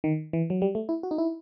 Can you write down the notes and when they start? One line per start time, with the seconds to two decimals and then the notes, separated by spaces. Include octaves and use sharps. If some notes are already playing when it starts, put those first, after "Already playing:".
0.04 D#3
0.33 E3
0.50 F#3
0.62 G3
0.75 A3
0.89 E4
1.03 F#4
1.11 D#4
1.18 E4